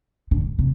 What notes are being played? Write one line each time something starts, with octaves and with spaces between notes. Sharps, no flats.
D3
C3